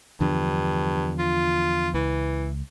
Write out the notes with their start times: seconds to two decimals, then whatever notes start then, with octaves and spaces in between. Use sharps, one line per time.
0.21 E2 G2 D3 F3
1.19 F4
1.94 C#2 E3